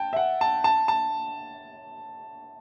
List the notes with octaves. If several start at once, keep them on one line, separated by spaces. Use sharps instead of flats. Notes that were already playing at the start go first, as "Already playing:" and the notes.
Already playing: G5 A5
E5
F#5
A5
A5
A5